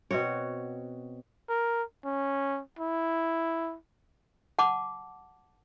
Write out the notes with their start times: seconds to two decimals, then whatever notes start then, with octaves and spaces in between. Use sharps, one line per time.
0.11 B2 C4 F#4 C#5
1.49 A#4
2.05 C#4
2.79 E4
4.59 F#5 A5 D6